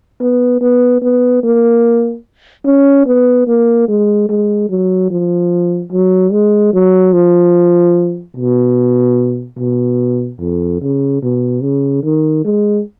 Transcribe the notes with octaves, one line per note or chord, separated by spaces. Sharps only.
B3
B3
B3
A#3
C#4
B3
A#3
G#3
G#3
F#3
F3
F#3
G#3
F#3
F3
B2
B2
F2
C#3
B2
C#3
D#3
G#3